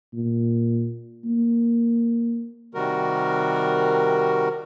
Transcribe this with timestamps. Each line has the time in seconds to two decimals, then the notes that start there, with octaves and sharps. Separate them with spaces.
0.14 A#2
1.26 A#3
2.75 C3 D#3 G3 F#4 A#4